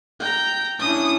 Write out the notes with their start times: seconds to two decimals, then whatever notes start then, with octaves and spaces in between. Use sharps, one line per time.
0.20 G5 A#5
0.79 C#4 D4 E4 D#6